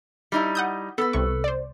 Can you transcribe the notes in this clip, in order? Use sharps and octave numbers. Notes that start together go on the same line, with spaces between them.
G3 D#4 E4
F#5 D#6 G6
B3 A4 B4
C2 C3 C#6
C5 D5